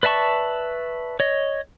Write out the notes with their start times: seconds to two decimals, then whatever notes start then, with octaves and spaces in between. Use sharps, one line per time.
0.03 B4 D5 E5 A5 C#6
1.20 C#5 D#5